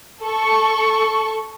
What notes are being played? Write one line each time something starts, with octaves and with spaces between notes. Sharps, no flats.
A4 C#6